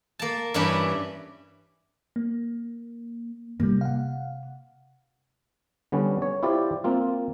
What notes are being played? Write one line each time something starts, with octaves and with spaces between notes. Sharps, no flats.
A#3 A5
G2 E3 G3 C#4 D4 B4
A#3
C3 G3 A#3 D4
F5 F#5
D3 G3 B3 C#4
C#5
E4 F4 G4 C5 D5
A#3 C4 F4